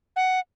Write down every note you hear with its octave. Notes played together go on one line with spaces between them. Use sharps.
F#5